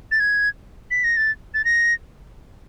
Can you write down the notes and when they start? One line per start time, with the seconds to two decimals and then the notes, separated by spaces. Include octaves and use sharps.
0.11 A6
0.20 G#6
0.91 B6
1.04 A#6
1.17 A6
1.54 A6
1.65 A#6